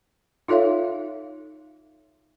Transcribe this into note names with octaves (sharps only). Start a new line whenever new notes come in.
D#4 F4 A4 C#5 E5 F5